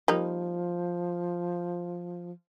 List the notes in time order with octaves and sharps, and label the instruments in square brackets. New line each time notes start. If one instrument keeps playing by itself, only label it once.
[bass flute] F3 [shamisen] G3 A#3 D#4